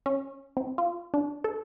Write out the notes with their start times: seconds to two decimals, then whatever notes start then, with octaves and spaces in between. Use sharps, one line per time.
0.06 C#4
0.57 C4
0.78 F4
1.14 D4
1.44 A4